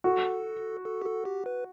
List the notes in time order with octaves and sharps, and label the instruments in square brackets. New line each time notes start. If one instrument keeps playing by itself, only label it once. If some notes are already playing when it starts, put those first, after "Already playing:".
[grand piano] F#4 [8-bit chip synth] A4
[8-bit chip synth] A4
G4
A4
G4
B4